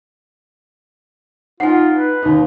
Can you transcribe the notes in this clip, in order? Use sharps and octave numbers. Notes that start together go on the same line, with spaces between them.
D#4 F4 F#5 G#5
B4
D#2 D#4